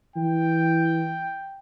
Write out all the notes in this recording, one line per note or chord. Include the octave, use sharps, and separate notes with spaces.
E3 G5